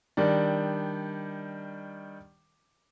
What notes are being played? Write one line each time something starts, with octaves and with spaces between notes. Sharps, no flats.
D#3 G3 D4